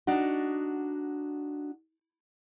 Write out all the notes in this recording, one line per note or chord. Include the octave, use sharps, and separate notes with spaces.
D4 D#4 F#4